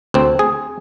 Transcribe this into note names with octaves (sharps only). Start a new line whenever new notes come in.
D2 C4
G#4